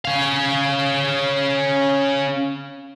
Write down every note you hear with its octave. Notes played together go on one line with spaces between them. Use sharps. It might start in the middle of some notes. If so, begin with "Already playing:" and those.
C#4 F5